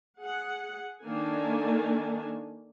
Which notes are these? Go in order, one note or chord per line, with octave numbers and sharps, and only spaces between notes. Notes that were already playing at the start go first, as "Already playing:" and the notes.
G#4 F#5
D#3 A#3 D4 A4 G#5